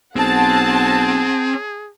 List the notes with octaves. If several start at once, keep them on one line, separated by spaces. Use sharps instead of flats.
B1 C4 G#4 F#5 A5